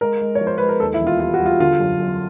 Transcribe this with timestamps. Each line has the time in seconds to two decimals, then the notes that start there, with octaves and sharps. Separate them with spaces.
0.01 G#3 A#4
0.21 G#3
0.35 C#5
0.41 F3
0.47 C5
0.58 G#3 B4
0.69 A#4
0.80 D#2 A4
0.94 E4
1.01 E1
1.07 F4
1.20 G3 F4
1.34 F#4
1.41 G3
1.46 F4
1.60 D3 F4
1.80 F#2
2.00 F#2